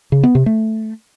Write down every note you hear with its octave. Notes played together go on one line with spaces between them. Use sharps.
C#3
B3
C3
A3